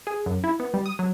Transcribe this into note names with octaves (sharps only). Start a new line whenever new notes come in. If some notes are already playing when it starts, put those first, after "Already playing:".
G#4
F#2
E4
B3
G3
D#6
F#3